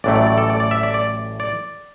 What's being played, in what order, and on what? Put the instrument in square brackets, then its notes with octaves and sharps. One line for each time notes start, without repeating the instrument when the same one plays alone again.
[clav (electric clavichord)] A1 A2 F#3 A3 D5
D5
D5
A4
D5
D5
E5
D5
D5
D5